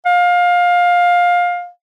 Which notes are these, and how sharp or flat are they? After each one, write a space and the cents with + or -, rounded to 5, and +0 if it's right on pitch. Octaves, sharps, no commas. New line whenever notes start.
F5 +20